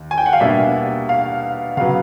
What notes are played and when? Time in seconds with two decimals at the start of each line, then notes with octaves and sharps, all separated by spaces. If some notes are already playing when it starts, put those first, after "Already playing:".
Already playing: D#2
0.11 G#5
0.18 G5
0.26 F#5
0.33 F5
0.40 B2 G3 A#3 D4 E5
1.09 F5
1.77 C#3 F#3 B3 F5